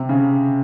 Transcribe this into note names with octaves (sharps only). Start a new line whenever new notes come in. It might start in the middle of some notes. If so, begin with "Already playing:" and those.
Already playing: C3
C#3